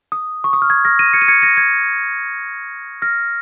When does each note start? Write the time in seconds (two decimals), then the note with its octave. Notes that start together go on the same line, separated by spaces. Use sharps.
0.12 D#6
0.44 C#6
0.53 D#6
0.62 F6
0.70 D#6 G#6
0.85 F6 A#6
0.99 A#6 D#7
1.13 G#6 C#7
1.22 D#7
1.28 G#6 C#7
1.42 A#6 D#7
1.57 G#6 C#7
3.02 F6 A#6